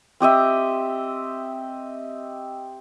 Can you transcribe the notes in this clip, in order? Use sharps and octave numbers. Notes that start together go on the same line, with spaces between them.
C4 G4 D#5 E5